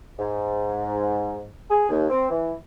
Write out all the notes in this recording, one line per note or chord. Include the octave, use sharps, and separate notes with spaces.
G#2
G#4
D#2
C4
E3